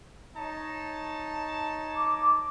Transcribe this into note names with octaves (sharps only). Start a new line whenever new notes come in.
D#4 C#5 A5
D6